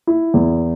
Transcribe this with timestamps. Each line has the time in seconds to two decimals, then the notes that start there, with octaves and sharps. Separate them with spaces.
0.07 E4
0.34 E2